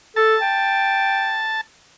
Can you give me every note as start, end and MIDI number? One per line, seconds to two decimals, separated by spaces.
0.16 0.36 69
0.16 1.61 81
0.42 1.45 79